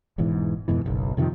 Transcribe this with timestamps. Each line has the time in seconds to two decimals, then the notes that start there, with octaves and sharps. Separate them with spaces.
0.18 E1 E2 G#2 E3
0.68 F2 G#2 B2 E3
0.86 F#1 B1
1.17 F2 C3 D#3 F3